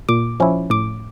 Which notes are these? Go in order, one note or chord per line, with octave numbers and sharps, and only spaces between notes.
A#2 D6
F3 C#4 E4
A2 D6